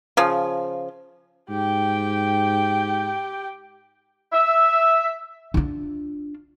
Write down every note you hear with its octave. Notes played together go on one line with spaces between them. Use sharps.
C#3 F3
G#2 G4 G5
E5
D4 F4